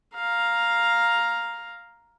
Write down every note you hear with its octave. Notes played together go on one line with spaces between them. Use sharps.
F5 A#5